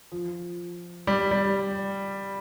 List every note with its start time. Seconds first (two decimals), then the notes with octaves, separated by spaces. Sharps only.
0.12 F3
1.07 G3
1.31 G3